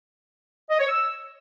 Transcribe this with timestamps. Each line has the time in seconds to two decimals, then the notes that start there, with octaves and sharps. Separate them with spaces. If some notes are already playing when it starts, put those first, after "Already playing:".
0.70 D#5
0.79 C#5
0.89 E6